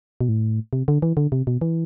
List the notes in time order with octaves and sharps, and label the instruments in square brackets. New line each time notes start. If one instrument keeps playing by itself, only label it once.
[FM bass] B2
A2
C3
D3
E3
D3
C3
B2
E3